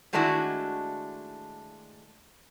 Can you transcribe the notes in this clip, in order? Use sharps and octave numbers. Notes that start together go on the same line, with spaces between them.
D#3 G#3 A3 D4 E4 F#4